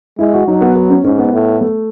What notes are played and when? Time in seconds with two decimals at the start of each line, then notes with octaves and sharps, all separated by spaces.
0.19 G#3 E4
0.34 F#4
0.47 F#3 D#4
0.61 B3
0.76 B3
0.90 C#4
1.04 G#2 C#4
1.19 B3
1.33 A2
1.61 A3